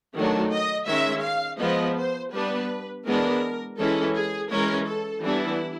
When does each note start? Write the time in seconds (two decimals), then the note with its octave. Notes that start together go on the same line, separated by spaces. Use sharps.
0.15 D#3 F#3 A3 D4
0.52 D#5
0.87 D#3 G#3 C#4 E5
1.24 F5
1.60 F3 G#3 B3 D#5
1.97 C5
2.33 G3 B3 D4 B4
3.05 E3 G#3 B3 D4 A#4
3.78 E3 G#3 C#4 A4
4.15 G#4
4.51 E3 G#3 C#4 A#4
4.87 A4
5.24 E3 G3 B3 D4 E4